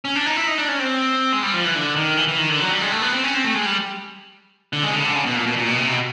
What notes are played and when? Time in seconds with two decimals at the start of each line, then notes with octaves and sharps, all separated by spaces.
0.05 C#4
0.16 D4
0.26 D#4
0.36 E4
0.48 D#4
0.58 D4
0.68 C#4
0.79 C4
1.32 G#3
1.43 G3
1.54 F3
1.65 E3
1.75 D3
1.96 D#3
2.17 E3
2.28 E3
2.38 D#3
2.49 D3
2.60 F#3
2.70 G3
2.81 G#3
2.92 A3
3.02 B3
3.12 C4
3.23 C#4
3.35 C4
3.44 A3
3.55 G#3
3.66 G3
4.73 D3
4.83 G#3
4.90 C#3
4.93 D3
5.00 C#3
5.04 D3
5.15 C#3
5.26 B2
5.35 A#2
5.46 B2
5.57 A#2
5.68 B2
5.78 C3
5.90 B2